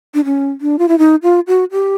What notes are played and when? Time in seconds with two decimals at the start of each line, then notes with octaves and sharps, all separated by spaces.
0.14 D4
0.25 C#4
0.61 D4
0.79 F4
0.88 E4
0.98 D#4
1.23 F4
1.47 F#4
1.72 G4